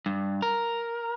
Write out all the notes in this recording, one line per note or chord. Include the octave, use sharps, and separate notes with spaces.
G2
A#4